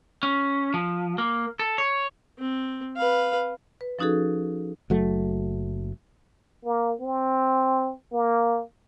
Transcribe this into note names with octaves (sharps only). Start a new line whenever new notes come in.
C#4
F3
A#3
A4
C#5
C4
B4 F5
B4
F3 C#4 D#4 F#4 G#4 A4
F#1 F#3 A3
A#3
C4
A#3